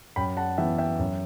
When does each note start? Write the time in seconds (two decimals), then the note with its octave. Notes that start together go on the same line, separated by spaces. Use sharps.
0.16 F#2 G5 B5
0.37 F#5 A5
0.57 E3 B3 E5 G5
0.78 E5 G5
0.99 F#2